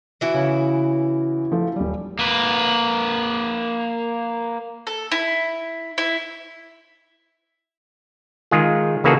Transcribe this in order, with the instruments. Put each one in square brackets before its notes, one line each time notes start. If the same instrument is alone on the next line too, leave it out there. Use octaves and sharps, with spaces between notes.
[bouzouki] E3 E4 F#4
[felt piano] C#3
F3 A3
D#1 G3
[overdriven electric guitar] A#3 B4
[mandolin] A4
E4
E4
[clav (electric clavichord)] D#3 G#3 F4 G#4
C#3 E3 A#3 F#4 G#4 A4